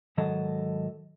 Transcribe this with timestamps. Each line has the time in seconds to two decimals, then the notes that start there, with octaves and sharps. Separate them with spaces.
0.17 G#2 D#3 F#3 A4 D#5